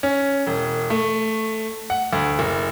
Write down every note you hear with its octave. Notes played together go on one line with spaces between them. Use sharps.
C#4
E1
A3
F#5
D2
F#1